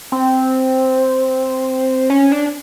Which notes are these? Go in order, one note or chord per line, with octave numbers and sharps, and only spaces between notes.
C4
C#4
D4